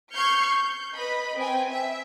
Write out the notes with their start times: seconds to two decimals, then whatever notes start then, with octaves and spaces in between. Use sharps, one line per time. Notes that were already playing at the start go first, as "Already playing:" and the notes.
0.14 C#6 F6 G6 G#6 C7 C#7
0.46 G6
0.95 B4 D#5 B5
1.36 C4 G5 G#5
1.69 E5